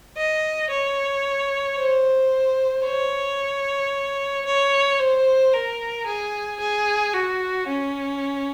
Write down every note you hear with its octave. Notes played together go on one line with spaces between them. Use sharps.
D#5
C#5
C5
C#5
C#5
C5
A#4
G#4
G#4
F#4
C#4